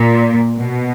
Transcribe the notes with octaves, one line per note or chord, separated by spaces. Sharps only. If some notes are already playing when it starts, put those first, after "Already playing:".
Already playing: A#2
B2